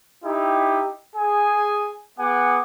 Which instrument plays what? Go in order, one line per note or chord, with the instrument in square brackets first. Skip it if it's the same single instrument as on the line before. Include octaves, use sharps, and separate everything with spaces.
[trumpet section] D#4 E4 G4
G#4 G#5
B3 G#4 F#5 G#5 D6